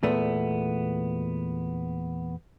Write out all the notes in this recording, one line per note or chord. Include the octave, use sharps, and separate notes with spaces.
E2 A#2 A3 B3